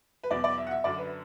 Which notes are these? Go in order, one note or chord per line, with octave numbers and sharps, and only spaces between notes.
B4
E2 B2 F#3 D5
D5
E5
F#5
E5
F#2 D3 F#3 D5
B4